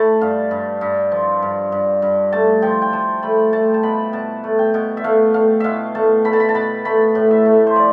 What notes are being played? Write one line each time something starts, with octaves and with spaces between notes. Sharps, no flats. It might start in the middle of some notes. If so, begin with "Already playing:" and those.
Already playing: A3 A5 B5
G2 F5
G2
G2
F3
G2
G2
G2
A3 A5
F3 G5
G5
F3 A5
A3 B5
A3 A5
A5
B2 B5
B2 A5
A3
G5
B2
E5
A3 F5
A3 F5
B2 E5 F5
A3 A5
A3 B5
A5
B5
A5
B2 B5
A3 B5
A2
E5
A3
C5
F3 D5